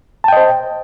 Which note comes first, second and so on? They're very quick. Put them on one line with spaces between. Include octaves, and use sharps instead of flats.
A5 G5 D#5 C5